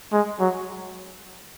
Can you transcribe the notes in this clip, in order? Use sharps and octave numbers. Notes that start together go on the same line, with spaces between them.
G#3
F#3